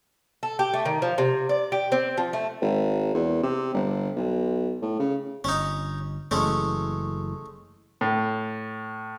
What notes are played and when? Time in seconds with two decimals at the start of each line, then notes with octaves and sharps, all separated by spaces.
0.43 A4
0.59 G4
0.73 A3
0.85 D#3
1.02 F3
1.18 C3
1.49 D5
1.72 G4
1.92 C4
2.17 F3
2.33 A3
2.62 G#1
3.15 E2
3.43 C3
3.74 G1
4.16 B1
4.82 A2
4.99 C#3
5.44 G1 C#4 D#4
6.31 F#1 E3 G#3 A3 C#4
8.01 A2